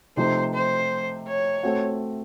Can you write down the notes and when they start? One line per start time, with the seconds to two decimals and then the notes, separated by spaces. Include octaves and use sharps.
0.17 C3 F3 A3 D#4 C5
0.54 C5
1.27 C#5
1.63 A3 C4 F#4